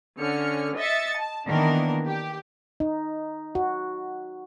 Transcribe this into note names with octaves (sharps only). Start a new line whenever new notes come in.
D3 C#4 F6 C#7
D#5 E5 A6 C#7
A5
D#3 E3 A#3 B3 D4 A#4
G4
D#4
F#4